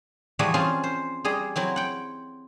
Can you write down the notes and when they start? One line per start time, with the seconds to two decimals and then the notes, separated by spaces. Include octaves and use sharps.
0.39 E3 F3 G3 F#4 G#4 E5
0.54 C4 C#4 F4 G#4
0.83 C5
1.25 G3 G#4 D#5
1.56 F#3 C4 E4
1.76 F#5 G5